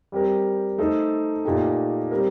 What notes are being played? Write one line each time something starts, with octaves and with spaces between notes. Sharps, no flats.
G3 C4 G4 A#4
A3 D#4 A4 C5
A#2 A3 D#4 G4
G3 C4 G4 A#4